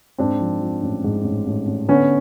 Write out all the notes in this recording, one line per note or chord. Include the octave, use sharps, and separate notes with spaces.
G#2 C4 D4
F3
F3
A1
G#2
A1
A1
A1
D3 B3 C#4